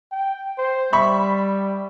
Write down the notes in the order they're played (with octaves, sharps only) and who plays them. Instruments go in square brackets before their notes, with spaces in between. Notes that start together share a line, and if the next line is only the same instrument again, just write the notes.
[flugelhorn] G5
C5
[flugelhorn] G3 [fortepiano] E5 B5 C#6